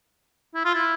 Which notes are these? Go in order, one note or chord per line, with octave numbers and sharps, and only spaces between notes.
E4
F4
E4